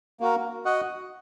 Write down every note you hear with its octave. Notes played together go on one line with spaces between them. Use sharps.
A#3 F#4 A#4
F#4 D#5 F#5